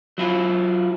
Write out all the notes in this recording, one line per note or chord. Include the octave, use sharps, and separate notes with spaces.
F#3 E4 F4